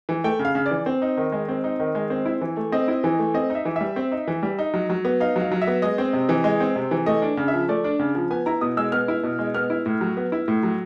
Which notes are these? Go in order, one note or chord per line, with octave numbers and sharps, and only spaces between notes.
E3
A3 G5
C#3
F5
C#3
D5
E3
C4
D#4
D#3
G#3
C4
D#4
D#3
G#3
C4
E4
E3
A3
C4 D#5
E4
E3
A3
C4 D#5
D#4
E5
E3
G3 E5
C4
D#4
E3
G3
D#4
F#3
F#3
B3
D#4 F5
F#3
F5
F#3
E5
B3
G#3 D#5
C4
C3
E3
G#3
C4
C3
E3
A3 D#5
D4
C#3
E5
F3
A3 D5
D4
C#3
F3
B3 G#5
E4 A#5
B2 D#6
G#3 E6
B3 F6
E4
B2
G#3
B3 F6
E4
A2
F#3
B3
E4
A2
F#3